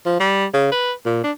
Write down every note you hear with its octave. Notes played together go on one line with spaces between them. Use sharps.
F3
G3
C#3
B4
A#2
D4